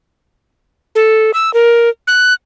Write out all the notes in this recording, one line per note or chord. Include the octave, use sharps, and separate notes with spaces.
A4
E6
A#4
F#6